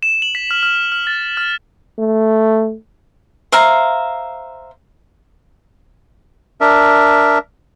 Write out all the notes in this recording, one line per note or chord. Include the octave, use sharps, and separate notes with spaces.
E7
F#7
B6
F6
F6
F6
A6
F6
A3
C5 E5 F5 A#5
D4 A#4 E5